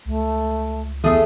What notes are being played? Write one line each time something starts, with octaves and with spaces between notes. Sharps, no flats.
C#2 A3
E2 A3 G#4 D#6